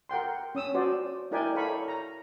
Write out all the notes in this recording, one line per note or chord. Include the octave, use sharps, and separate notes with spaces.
A#4 F#5 G5 C6
C#4 D#6 E6
F#4 C5 D5
D#4 E4 A#4 D5 G5 G#5
A4 A#4 C#5 F5 B5 C#6
A#5